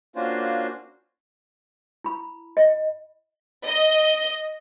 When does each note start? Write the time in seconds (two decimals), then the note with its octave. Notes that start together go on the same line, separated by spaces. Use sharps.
0.16 A#3 C#4 D4 F4 F#4 C5
2.04 E4 B5
2.57 D#5
3.66 D#5